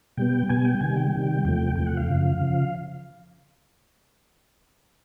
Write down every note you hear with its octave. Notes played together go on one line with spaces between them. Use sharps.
B2 G3 B3 G5
B2 G3 B3 G#5
G5
C3 D#3 G3 G#5
G5
C3 D#3 G3
E2 C3 F3 A3 G5
E2 C3 F3 A3 G5
F#5
F5
F#2 C#3 F3
C#3 F3